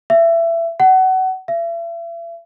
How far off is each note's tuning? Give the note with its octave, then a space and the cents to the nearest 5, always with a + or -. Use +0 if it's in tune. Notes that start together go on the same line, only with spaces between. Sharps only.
E5 +20
F#5 +25
E5 +40